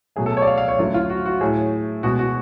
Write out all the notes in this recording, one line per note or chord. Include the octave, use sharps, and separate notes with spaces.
B2 F#3 A3 G#4
A4
C#5
D5
F5
F5
C#5
F#2 D3 F#3 A3 F4
F4
F#4
F#4
A2 F#3 A3 G#4
B2 G#3 F#4
F#4